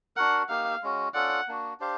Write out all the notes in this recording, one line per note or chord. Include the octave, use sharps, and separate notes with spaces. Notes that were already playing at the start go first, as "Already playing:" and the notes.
D4 F#4 A#4 F#5
A#3 D#4 G4 F5
G#3 C#4 F#4
C#4 F4 A4 D5 F#5
A#3 D4 F#4
D4 G4 C5 F5